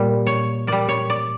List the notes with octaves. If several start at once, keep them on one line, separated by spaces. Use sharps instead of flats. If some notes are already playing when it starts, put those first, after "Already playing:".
Already playing: A#2 G3
C#5
A#2 G3 D5
C#5
D5